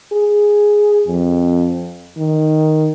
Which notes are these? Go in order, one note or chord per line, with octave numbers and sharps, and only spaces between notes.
G#4
F2
D#3